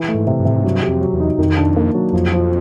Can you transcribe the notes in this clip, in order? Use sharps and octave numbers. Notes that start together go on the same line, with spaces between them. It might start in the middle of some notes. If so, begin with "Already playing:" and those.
Already playing: E3
A3
G#2
C3
G2
A2 C3
G#2
G2 F#3
G4
F2
F#3
E2
D#4
F2 D#3
D4
A#3
F#3
F2 F3
F3